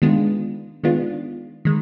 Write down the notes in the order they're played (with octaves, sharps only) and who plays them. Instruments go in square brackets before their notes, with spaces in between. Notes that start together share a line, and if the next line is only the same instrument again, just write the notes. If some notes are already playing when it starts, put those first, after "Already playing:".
[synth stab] D#3 G#3 B3 D4 F4
D#3 G#3 B3 D4 F4
D#3 G#3